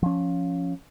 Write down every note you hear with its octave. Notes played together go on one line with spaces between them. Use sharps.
F3 C#4